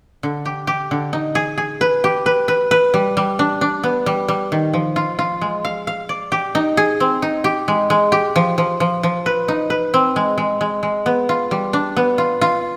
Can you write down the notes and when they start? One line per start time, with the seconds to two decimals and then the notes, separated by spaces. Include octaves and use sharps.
0.23 D3
0.46 G4
0.67 G4
0.91 D3
1.13 D#4
1.35 G#4
1.58 G#4
1.81 B4
2.04 G4
2.26 B4
2.48 B4
2.71 B4
2.94 G3
3.17 G3
3.39 D4
3.61 D4
3.83 B3
4.06 G3
4.28 G3
4.52 D#3
4.74 F3
4.96 F4
5.19 F4
5.41 G#3
5.65 F5
5.87 F5
6.09 D5
6.32 G4
6.55 D#4
6.77 G#4
7.00 C4
7.22 D#4
7.44 G4
7.68 G#3
7.90 G#3
8.12 G4
8.36 F3
8.58 F3
8.80 F3
9.03 F3
9.26 B4
9.48 D#4
9.70 B4
9.94 C4
10.16 G#3
10.38 G#3
10.61 G#3
10.83 G#3
11.06 B3
11.29 F4
11.51 G3
11.73 D4
11.97 B3
12.18 F4
12.41 F4